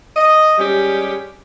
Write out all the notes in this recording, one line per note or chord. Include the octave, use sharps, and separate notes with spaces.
D#5
G3 G#3 C#4 G4